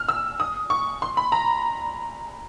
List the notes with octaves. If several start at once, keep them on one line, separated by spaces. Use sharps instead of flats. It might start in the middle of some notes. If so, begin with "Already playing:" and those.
Already playing: F6
E6
D#6
C#6
C6
B5
A#5